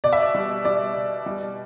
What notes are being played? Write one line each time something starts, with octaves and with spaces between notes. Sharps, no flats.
B2 D5
E5
D5
G3
G3 D5
B2
G3